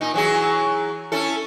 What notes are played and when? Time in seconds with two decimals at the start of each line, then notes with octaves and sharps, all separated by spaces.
0.01 A#2 D#4
0.14 E3 F#3 G#4
1.12 C#4 E4 A4